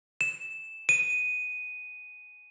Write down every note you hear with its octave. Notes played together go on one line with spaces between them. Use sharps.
E7
D#7